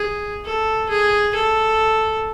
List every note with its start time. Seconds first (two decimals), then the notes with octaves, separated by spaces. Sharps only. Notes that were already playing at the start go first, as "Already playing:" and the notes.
Already playing: G#4
0.45 A4
0.89 G#4
1.35 A4